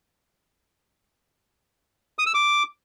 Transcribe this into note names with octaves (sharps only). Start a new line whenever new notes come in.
D#6
E6
D6